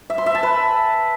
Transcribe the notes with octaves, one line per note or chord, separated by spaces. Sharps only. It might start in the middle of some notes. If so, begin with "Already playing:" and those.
E5
C6
E5
A5
B4